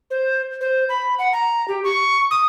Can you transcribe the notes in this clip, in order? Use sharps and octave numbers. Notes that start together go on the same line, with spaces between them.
C5
C5
B5
F#5
A#5
G4
C#6
D#6